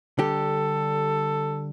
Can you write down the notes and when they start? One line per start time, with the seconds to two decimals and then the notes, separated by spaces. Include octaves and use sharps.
0.19 D3 G3 G4 A4